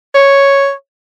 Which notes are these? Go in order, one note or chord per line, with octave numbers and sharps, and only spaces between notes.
C#5